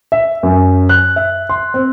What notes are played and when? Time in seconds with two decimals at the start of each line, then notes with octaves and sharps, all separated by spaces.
0.12 E5
0.43 F#2
0.89 F#6
1.16 E5
1.49 C6
1.74 C4